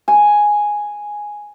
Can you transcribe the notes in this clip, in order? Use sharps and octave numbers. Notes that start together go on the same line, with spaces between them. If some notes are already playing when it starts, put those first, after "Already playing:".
G#5